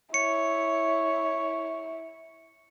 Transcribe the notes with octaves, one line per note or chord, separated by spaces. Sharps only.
E4 C#5 C#7